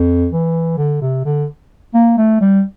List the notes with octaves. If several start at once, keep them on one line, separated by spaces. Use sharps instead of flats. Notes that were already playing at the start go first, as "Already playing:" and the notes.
Already playing: F2
E3
D3
C3
D3
A#3
A3
G3